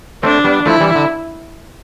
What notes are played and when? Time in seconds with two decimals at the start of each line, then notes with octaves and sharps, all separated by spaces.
0.23 A3 C4 D4
0.44 G3 B3
0.66 F3 A3 E4
0.81 E3 G3
0.95 D3